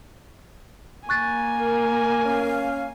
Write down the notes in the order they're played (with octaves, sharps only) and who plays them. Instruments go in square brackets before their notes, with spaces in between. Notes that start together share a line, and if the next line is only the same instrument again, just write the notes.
[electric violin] A#3 G#5 [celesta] C#6 F#6 A6
[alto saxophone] A#4
[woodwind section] C#4 F5